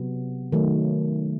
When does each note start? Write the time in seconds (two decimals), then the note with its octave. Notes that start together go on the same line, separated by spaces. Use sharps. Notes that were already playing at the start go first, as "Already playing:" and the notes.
Already playing: C3 F#3 B3
0.52 D#3 F#3 A3